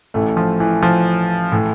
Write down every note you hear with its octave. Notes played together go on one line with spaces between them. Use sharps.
A1 A2 E3 A3
F3
E3
F3
A2 E3